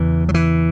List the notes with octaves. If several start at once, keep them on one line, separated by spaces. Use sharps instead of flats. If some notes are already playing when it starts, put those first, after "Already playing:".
Already playing: E2 C#3 E3
F#3
E3